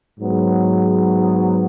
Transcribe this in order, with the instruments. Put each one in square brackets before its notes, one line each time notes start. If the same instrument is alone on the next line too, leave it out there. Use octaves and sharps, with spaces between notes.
[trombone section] G#2 F#3 B3